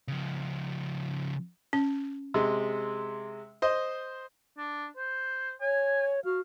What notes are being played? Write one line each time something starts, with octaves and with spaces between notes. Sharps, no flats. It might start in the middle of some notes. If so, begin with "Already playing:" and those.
C#3 F3
C#4
C3 G#3
C5 D#5
D4
C5
C#5 G#5
F#4 F5